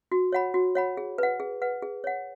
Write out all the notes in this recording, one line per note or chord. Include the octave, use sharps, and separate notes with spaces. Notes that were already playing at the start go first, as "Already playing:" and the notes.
F#4
C#5 F#5 B5
F#4
C#5 F#5 B5
G#4
B4 F#5
G#4
B4 F#5
G#4
C#5 F#5